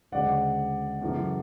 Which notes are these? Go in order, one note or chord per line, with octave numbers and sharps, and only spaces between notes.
D2 C#3 G#3 D5 F#5
F#2 C#3 E3 A3